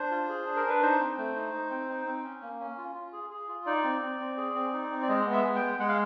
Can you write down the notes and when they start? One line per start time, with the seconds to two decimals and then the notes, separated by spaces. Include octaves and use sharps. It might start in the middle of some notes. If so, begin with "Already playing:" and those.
Already playing: D4 C5
0.11 F4
0.29 G#4
0.46 D4
0.56 A#4
0.65 D4 B4
0.82 D#4 C5
1.00 C4
1.18 A3
1.35 D#4
1.53 D#4
1.70 C4
1.89 D#4
2.06 C4
2.24 C#4
2.42 A#3
2.60 C#4
2.78 F4
2.95 F4
3.13 G#4
3.30 G#4
3.48 F4
3.66 D#4 D5
3.84 C4
4.02 C4
4.20 C4
4.37 G#4
4.55 C4
4.73 D#4
4.91 C4
5.02 D5
5.09 G#3 D#5
5.26 B3
5.32 E5
5.44 G#3
5.56 G5
5.62 G#3
5.79 G#3 F#5
5.89 F5